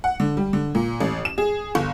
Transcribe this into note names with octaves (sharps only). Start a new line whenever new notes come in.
F#5
D3
G3
D3
A#2
A1
E7
G#4
G1